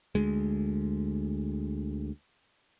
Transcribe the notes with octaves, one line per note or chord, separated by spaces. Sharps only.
D2 G#3